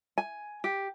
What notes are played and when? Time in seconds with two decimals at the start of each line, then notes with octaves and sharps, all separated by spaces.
0.18 G#5
0.64 G4